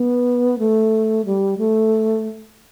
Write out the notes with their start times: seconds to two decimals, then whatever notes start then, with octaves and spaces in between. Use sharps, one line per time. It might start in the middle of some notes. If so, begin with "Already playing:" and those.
Already playing: B3
0.59 A3
1.25 G3
1.58 A3